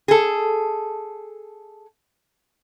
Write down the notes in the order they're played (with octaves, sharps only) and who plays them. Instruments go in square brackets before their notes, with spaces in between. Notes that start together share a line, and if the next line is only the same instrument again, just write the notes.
[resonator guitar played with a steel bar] G#4 A4